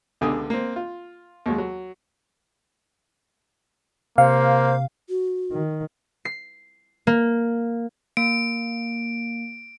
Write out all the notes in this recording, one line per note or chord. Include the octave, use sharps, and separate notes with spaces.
C#2 B2 D3 G4 G#5 D#6
A#3 C4
F4
D#2 F#3 G#3
F#3
C3 A#3 C5 F5
F#4
D#3
C7
A#3
A#3 D7